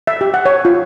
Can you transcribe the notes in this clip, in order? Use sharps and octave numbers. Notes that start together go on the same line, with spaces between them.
E5
G4
F#5
C#5
F4